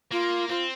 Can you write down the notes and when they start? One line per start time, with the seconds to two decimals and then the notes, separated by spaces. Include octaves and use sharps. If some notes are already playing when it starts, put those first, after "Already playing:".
0.11 A#3 F4
0.49 C4 F4